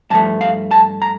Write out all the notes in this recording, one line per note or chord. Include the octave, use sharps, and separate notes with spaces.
G2 F3 A3 A5
F5
A5
A#5